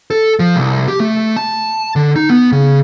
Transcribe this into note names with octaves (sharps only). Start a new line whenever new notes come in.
A4
F3
C2
G4
A3
A5
D3
D#4
B3
C#3